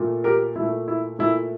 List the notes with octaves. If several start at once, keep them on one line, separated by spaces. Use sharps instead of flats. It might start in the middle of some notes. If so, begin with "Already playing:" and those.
Already playing: A#2 A3
G4 A#4
A#2 A3 E4
E4
A#2 A3 E4